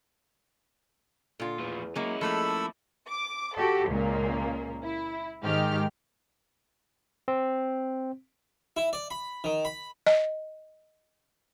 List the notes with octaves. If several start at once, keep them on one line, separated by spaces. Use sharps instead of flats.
A#2 D3 F4
E2 A2 F3
F#3 G#3 A#3 C#4 E4
F3 A3 A#3 A4 B5 E6
D6
F#4 G4 A4
C#2 A#2 A#3
E4
G#2 D#3 G4 F6
C4
E4
D5
B5
D#3
B5
D#5